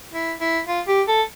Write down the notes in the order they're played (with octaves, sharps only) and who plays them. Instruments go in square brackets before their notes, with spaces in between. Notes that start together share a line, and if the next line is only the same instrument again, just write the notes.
[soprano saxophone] E4
E4
F4
G4
A4